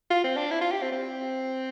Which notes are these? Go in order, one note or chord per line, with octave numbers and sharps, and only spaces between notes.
F4
C4
D4
E4
F4
G4
C4
C4